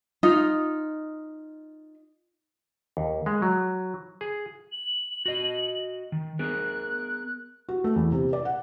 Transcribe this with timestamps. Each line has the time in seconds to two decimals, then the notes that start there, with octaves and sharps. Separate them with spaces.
0.23 D#4 F4
2.97 D#2
3.26 G#3
3.42 F#3
4.21 G#4
4.72 F#7
5.26 F#4 D#5
6.12 D#3
6.39 B3 G#4 A#4 F#6
7.69 F#4
7.84 A3
7.96 E2
8.12 C3
8.33 D5
8.45 F#5